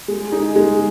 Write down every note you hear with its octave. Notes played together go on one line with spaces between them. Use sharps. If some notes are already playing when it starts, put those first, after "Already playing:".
G#3
D#4 G#4
G#3